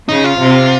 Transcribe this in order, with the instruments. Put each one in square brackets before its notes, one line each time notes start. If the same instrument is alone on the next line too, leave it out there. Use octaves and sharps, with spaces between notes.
[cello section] C#3 [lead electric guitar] D#4
[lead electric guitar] F4
[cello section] C3